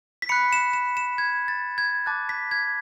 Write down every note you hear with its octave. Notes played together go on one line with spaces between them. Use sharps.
B6
B5 F#6 C#7
E7
E7
E7
G#6
A6
G#6
A5 D6 F#6 A6
B6
G#6